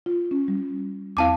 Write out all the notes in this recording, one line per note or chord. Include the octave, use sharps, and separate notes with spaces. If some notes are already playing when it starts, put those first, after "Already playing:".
F4
C#4
G3
E2 C4 E4 F5 A5 D6